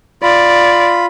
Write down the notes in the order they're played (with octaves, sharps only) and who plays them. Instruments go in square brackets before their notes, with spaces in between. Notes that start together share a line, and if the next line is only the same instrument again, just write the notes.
[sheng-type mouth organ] F4 B5 [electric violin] D5